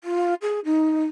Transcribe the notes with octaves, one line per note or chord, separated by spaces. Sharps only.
F4
G#4
D#4